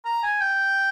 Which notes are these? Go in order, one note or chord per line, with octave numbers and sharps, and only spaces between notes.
A#5
G#5
G5